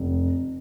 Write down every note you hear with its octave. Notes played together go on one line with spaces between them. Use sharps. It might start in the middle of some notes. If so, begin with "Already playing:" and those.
Already playing: F1